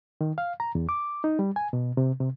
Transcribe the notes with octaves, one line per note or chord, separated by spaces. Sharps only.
D#3
F5
A#5
E2
D6
D#4
G3
G#5
B2
C3
C3